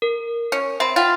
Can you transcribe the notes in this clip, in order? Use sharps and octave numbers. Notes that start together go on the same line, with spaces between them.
A#4
C#4
C4 E5 B5
F4 F#5 G5 A6